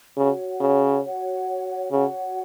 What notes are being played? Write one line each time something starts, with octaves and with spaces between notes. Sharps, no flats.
C#3 F#4 C#5 F#5
C#3
F#4 C#5 F#5
C#3 F#4 C#5 F#5